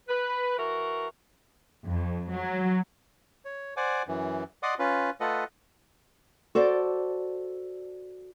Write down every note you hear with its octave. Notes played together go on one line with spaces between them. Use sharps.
B4
E3 F#4 A#4
F2
F#3
C#5
C5 D5 F#5 G#5 D6
F#2 E3
D5 D#5 F#5 C6 D6 D#6
C#4 F4 B4
A3 F4 A4 B4 D#5 F#5
F#4 A4 C5 D5